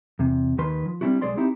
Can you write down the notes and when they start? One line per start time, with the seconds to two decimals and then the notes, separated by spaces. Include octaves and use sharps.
0.19 E2 C3
0.58 D#2 D#3 B4 C6
0.86 F3
1.01 G3 C4 D4 E4 F#4
1.22 B1 G#3 G#4 C5 D5 C6
1.37 C4 D#4 E4 G4